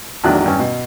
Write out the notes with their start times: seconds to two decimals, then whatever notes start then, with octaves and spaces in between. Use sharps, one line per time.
0.24 A1 E2 D#3 F#3 D4 F#6
0.46 G2 C#4
0.59 B2